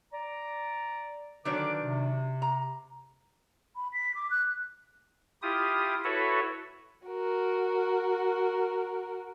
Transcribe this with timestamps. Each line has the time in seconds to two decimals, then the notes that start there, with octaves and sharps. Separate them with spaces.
0.13 D5 A#5
1.45 D3 D#3 F#3 D4 B4 D6
1.81 C3
2.42 A#5
3.76 B5
3.93 B6
4.15 D6
4.30 F#6
5.42 E4 F4 G4 D#6
6.04 E4 F#4 A4 B4 C#5 E5
7.07 F#4 A#4